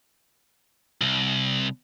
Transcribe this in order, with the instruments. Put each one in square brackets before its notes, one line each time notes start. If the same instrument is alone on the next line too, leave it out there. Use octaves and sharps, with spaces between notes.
[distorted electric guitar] C2